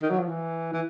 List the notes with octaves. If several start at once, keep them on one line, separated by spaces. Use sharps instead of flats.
D#3
F#3
F3
E3
E3